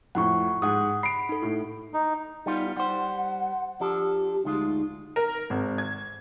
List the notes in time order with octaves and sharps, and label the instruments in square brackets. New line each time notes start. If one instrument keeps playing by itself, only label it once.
[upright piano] F2 A2 F3 [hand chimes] F#5 C#6
[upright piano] G#2 [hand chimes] F#5 D#6
[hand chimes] B5 [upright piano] C7 D7
[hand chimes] D#4 A4
[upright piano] A2
[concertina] D#4
[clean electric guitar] G3 B3 F4 [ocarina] D#4
[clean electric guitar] G3 C5 [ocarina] F#5
[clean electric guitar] F3 D4 A4 [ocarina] G4
[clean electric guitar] D2 G#3 F4 [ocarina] D#4
[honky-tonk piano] A#4
G#1
G#6